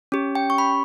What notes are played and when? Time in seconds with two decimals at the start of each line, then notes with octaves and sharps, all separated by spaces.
0.12 C#4 G4
0.35 G5
0.50 C#6
0.58 B5